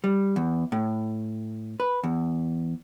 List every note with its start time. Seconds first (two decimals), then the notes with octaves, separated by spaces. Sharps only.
0.04 G3
0.36 E2
0.72 A2
1.80 B4
2.04 E2